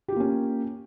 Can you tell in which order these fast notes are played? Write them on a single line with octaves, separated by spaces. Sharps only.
G4 F4 A#3 C#4